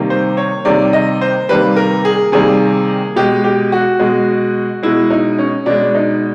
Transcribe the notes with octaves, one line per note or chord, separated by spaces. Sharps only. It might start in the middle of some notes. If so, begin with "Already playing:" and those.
Already playing: C3 D#3 G3 A#3
C5
C#5
C3 D#3 G3 A#3 D5
D#5
C5
C3 D#3 G3 A#3 B4
A#4
G#4
C3 D#3 G3 A#3 G#4
B2 G#3 G4
G4
F#4
B2 G#3
B2 G#3 E4
D#4
C#4
B2 G#3 D4
D#4